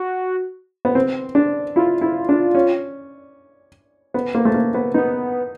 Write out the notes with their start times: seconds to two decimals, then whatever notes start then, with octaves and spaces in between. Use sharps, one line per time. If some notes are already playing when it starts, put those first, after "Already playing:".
Already playing: F#4
0.85 B3
0.95 C4
1.35 D4
1.76 E4 F4
2.01 E4
2.29 D4
2.55 C#4
4.14 B3
4.35 A#3
4.45 A3
4.54 A#3
4.74 B3
4.94 B3 D#4